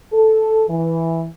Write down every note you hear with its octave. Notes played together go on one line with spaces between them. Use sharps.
A4
E3